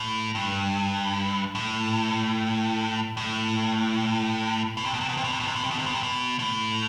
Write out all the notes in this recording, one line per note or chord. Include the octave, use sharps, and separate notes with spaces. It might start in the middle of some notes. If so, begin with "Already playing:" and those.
Already playing: A2
G2
A2
A2
B2
C3
B2
C3
B2
C3
B2
C3
B2
C3
B2
C3
B2
C3
B2
C3
B2
A2